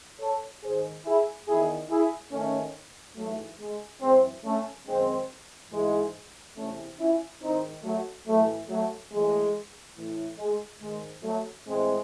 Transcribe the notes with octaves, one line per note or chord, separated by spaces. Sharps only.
A4 C#5
G#2 D#3 G#4 C5
E4 G#4
E2 D#3 E4 G#4
E4 G#4
G#2 D#3 A3 C#4
G#2 E3 F#3 A3
G#3
F#2 E3 G#3 C4
A3 C#4
F#2 D#3 G#3 C4
G#2 E3 G#3
E2 C3 E3 A3 C#4
C#4 E4
G#2 D#3 C4 D#4
F#3 A3
A2 E3 F#3 A3
F#3 A3
A2 E3 G#3
A2 E3
G#3
G#2 D#3 G#3
F#3 A3
A2 E3 G#3 C4